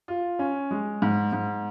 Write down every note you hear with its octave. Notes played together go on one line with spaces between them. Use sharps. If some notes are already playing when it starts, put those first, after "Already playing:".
F4
C#4
G#3
G#2
G#2